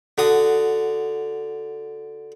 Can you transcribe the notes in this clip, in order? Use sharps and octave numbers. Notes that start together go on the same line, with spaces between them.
D3 F#4 D#6